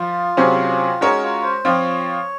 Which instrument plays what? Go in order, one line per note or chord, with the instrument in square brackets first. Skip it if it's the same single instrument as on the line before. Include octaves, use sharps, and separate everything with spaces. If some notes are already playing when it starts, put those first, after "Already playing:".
Already playing: [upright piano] F3 [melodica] F4
[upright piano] C3 F#3 C#4 G#4 C5
[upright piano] G#3 C#4 F#4 A#4 C#5 [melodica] D#4
[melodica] F4
C5
[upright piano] F3 C4 F4 [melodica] C#5